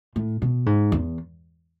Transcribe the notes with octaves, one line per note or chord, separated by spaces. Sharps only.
A2
B2
G#2
E2